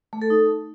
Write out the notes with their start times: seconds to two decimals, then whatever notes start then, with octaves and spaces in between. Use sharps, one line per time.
0.13 A3
0.22 A4
0.30 D#4